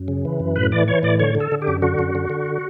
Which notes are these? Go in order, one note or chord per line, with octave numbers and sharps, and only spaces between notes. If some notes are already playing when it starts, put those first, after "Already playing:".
Already playing: F#2
C#3
E3
F#2
A2 B4
E3 D5
E3 C#5
A2 D5
D3 C#5
D3
A4
D3
G4
F#2
D3 F#4
F#2
D3
D3